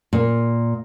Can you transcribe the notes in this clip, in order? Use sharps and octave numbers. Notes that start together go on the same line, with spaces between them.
A#2